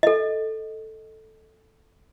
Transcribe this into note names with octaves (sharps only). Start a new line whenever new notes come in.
A4 D#5